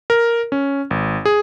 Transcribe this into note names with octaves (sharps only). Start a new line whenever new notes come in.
A#4
C#4
G#1
G#4